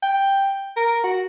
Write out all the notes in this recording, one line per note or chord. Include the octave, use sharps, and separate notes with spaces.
G5
A#4
F#4